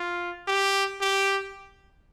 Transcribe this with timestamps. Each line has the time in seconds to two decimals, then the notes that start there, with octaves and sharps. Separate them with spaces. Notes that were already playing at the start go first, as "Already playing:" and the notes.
Already playing: F4
0.48 G4
1.01 G4